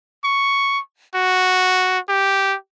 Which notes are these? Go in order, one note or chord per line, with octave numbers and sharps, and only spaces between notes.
C#6
F#4
G4